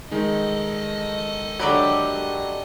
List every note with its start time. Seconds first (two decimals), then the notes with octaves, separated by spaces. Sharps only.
0.11 D#3 G#3 D#4 A4 D#5
1.60 D3 F#3 G4 D5 B5